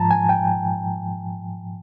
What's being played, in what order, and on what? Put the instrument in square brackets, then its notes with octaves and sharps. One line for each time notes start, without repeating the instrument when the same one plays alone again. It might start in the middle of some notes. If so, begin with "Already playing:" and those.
Already playing: [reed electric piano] G#2 F3 A5 A#5
G#5
G5